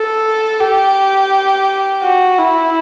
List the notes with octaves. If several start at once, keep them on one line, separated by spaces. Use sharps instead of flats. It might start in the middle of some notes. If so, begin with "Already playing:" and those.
Already playing: A4
G4
F#4
E4